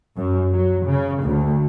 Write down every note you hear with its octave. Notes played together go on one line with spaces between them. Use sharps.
F#2
F#3
C#3
D2